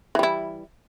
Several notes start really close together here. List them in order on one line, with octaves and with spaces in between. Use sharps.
E3 G3 E4